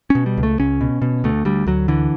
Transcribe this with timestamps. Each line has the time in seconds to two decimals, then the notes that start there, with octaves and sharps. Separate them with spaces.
0.10 B2 C#4
0.26 G3
0.37 C#2
0.43 A3
0.59 C#2 C#4
0.81 B2
1.02 B2
1.24 D2 A3
1.45 D2 G3
1.67 D2 F#3
1.88 D3 E3